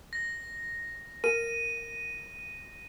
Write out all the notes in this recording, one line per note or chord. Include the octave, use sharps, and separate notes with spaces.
A#6
A#4 D#7